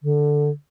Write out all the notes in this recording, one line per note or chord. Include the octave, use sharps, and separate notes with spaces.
D3